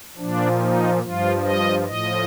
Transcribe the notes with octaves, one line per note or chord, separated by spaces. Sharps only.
A#2 F3 D4
D#4
G2 F3 F4
D#5
A2 F3 D#5